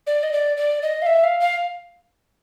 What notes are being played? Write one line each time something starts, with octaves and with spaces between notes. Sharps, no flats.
D5
D#5
D5
D5
D#5
F5
E5
F5
F5